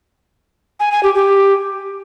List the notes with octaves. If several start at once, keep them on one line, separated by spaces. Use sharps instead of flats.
G#5
G#5
G4
G4